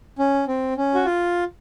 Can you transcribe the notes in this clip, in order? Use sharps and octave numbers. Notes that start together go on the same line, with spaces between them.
C#4
C4
C#4
F#4
F4